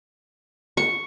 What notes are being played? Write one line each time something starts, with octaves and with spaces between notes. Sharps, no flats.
C#6